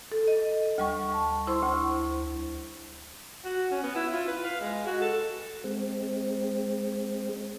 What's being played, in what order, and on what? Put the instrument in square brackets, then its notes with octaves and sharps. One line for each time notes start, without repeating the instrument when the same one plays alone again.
[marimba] A4
D#5
D2 G3 C#6
A5
E4 C5 C6 C#6
D2
[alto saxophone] F#4
C#4
B3
E4
F4
B4
F5
G#3
F#4
A4
[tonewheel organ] G#3 C4